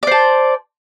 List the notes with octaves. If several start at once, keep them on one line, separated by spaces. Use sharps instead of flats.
C5 D5 A5